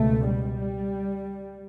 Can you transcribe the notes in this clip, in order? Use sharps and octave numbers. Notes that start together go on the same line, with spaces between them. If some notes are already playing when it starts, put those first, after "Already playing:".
Already playing: C#2 B2 A3
G3